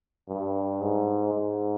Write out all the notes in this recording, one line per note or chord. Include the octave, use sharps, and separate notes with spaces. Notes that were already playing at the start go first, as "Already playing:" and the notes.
G2
G#2
G#2